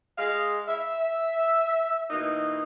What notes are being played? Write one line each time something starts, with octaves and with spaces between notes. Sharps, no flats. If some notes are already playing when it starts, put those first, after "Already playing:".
G#3 F5
E5
B2 E3 A#3 D#4